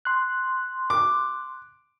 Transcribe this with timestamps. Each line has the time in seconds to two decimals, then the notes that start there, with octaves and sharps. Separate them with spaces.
0.05 C6 F#6
0.90 D6